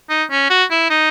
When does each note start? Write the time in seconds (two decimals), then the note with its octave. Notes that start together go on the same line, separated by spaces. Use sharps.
0.10 D#4
0.31 C#4
0.50 F#4
0.71 E4
0.90 D#4